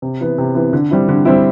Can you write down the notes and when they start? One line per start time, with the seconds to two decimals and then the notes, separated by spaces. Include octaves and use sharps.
0.02 C3
0.21 E3 B3
0.38 C3
0.55 E3 B3
0.73 D3
0.91 G3 C4 E4
1.08 D3
1.25 G3 C4 E4